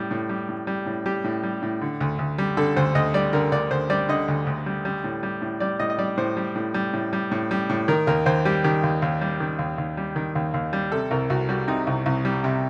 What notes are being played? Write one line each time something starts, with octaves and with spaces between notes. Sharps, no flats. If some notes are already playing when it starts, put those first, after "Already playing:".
Already playing: A2 G3
A2
G3
A2
G3
A2
G3 G4
A2
G3
A2
D3
D2
D2
G3
D3 A4
D2 C5
D2 D#5
G3 D5
D3 A#4
D2 D5
D2 C5
G3 D5
D3 D#5
D2
D2
G3
G3
A2
G3
A2
G3 D5
A2 D#5
D#5
G3 D5
A2 C5
G3
A2
G3
A2
G3
A2
G3
A2
D#3 A#4
D#2 A#4
D#2 C5
G3 G4
D#3 G4
D#2
D#2
G3
D#3
D#2
D#2
G3
D#3
D#2
D#2
G3
C3 A4
C2 A#4
C2 F#4
G3 F#4
C3 D#4
C2
C2
G3
C3